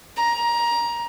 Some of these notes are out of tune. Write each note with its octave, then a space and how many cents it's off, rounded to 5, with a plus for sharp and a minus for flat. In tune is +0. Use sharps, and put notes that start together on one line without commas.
A#5 +20